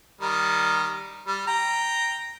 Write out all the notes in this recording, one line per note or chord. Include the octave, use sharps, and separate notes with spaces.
D#3 G3
G3
G5 A#5